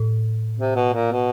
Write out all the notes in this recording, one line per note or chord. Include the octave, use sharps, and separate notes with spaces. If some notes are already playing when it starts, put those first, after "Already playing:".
Already playing: A2
C3
B2
A#2
B2